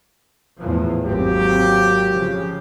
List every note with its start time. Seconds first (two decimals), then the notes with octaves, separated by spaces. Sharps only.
0.59 E2 A2 F3
1.05 G#1 F#3 A#3 C4 G4
2.12 C#3 F3